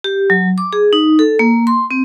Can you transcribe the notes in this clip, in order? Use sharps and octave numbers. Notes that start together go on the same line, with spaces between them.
G4
F#3
D6
G#4
D#4
A4
A#3
C6
C4